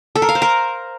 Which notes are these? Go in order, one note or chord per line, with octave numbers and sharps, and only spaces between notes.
A4
A#4
F5
C5
A#4